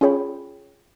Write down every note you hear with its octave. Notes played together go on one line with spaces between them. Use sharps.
C#4 F4 G#4 C#5 G5 B5